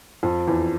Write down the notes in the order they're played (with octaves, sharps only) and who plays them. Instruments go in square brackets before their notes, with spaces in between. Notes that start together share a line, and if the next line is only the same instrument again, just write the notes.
[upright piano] F2
E2